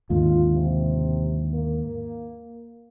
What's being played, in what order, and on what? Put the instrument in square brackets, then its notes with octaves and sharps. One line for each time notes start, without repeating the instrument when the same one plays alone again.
[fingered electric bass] D#2 G#2 D3 [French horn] F4
[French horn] C3
A#3